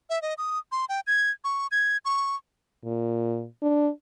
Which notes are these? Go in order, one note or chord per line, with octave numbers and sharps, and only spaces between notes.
E5
D#5
D#6
C6
G5
G#6
C#6
G#6
C#6
A#2
D4